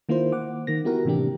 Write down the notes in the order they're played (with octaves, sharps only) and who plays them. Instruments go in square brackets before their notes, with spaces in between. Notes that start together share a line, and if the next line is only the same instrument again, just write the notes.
[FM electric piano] D#3 A#3 E4 F4 C5
F#5 D6
D#3 A#3 A#6
B3 E4 F#4 G4 A#4 F#5
A2 C3 E3 A#3 D4 G4